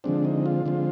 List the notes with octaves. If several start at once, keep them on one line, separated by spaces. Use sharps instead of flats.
D3 F3 G#3 C4 D4
D#4
F4
D3 F3 G#3 C4